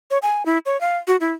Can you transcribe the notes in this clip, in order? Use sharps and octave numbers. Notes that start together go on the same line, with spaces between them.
C#5
G#5
E4
C#5
F5
F#4
E4